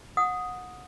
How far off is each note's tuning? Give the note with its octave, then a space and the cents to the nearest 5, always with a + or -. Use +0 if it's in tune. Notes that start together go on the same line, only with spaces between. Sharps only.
F#5 -25 D#6 +0